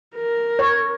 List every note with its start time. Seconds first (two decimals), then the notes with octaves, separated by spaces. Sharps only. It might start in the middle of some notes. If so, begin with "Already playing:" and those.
0.15 A#4
0.59 C#5